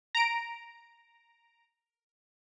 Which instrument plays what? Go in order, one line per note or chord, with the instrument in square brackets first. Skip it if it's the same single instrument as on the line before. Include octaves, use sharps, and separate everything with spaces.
[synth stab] A#5 D7